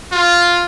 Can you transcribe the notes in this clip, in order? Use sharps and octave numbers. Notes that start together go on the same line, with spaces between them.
F4